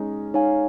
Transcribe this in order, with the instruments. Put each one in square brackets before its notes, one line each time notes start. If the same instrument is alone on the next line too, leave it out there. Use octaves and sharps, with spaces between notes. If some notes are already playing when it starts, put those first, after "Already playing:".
Already playing: [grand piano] G#3 C#4 D#4
[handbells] D#4 C#5 F5 G#5